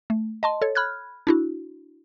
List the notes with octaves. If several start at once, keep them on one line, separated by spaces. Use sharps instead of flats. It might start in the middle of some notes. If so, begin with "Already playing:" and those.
A3
D#5 A5 C6
A4 C#5
B5 F6 F#6 G#6
D4 E4 F#4